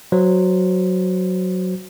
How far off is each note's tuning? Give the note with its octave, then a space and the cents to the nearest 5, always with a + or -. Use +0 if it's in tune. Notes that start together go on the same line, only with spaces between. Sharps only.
F#3 +0 C5 -15